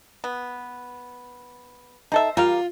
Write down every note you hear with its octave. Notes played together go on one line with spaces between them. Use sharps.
B3
D#4 A4 C5 E5
G3 F4 A#4 F5